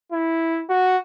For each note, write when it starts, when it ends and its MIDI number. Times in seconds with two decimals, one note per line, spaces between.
0.12 0.63 64
0.69 0.97 66